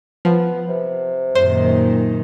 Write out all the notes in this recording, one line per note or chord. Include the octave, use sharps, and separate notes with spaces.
F3 B3
C3
F#2 A#2 D#3 C5